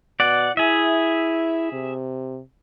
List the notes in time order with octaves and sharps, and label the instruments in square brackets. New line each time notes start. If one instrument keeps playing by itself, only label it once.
[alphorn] B2 [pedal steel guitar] D5 F#5
[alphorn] E4 [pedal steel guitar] G#4 E5
[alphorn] C3